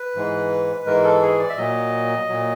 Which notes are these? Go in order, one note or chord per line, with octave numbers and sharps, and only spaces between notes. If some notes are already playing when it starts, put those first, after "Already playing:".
Already playing: B4
G#2 E3 G#3
G#2 E3 G#3 A#4
A4
G#4
D5
E5
A#2 F#3 D#5
A#2 F#3